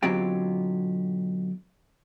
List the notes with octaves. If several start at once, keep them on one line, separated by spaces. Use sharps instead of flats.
B2 D3 F#3 C4 F4 G4